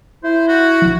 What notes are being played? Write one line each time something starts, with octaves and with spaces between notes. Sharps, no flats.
E4 C5
F#4
A#1 F3